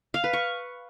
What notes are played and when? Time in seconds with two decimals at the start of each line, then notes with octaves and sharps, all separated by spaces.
0.14 F5
0.24 B4
0.33 C#6